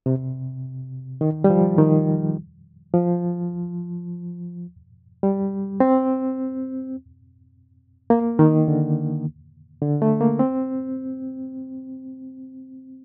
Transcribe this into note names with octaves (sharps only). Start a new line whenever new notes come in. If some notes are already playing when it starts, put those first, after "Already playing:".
C3
D#3
G3
F3
D#3
F3
G3
C4
A#3
D#3
D3
D3
A3
A#3
C4